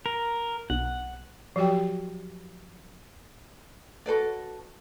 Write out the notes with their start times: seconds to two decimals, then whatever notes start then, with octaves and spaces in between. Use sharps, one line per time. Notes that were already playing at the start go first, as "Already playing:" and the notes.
0.06 A#4
0.70 B1 F#5
1.56 F3 F#3 F#4 G4 G5
4.06 F#4 A4 B4 D5